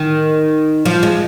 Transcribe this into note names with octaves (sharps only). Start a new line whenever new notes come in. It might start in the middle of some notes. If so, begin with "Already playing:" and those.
Already playing: D#3
F3
G#3